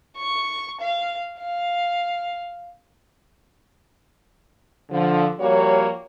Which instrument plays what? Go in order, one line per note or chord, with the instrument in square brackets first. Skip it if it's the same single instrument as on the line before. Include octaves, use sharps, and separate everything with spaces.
[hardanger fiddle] C#6
F5
F5
[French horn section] D3 F3
F3 G3 A#3 F#4 C#5